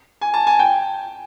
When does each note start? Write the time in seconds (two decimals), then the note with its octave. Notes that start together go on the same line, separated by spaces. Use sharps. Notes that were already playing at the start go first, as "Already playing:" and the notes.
0.21 G#5
0.34 A5
0.47 G#5
0.59 G5